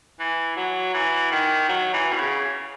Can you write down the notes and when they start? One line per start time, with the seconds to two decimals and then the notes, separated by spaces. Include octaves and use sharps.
0.20 E3
0.57 F#3
0.94 E3
1.31 D#3
1.68 F#3
1.93 E3
2.12 B2
2.18 C#3